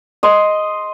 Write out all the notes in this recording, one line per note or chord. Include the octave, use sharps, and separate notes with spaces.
D#5 C6